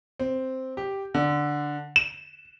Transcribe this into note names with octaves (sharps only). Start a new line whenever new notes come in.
C4
G4
D3
E7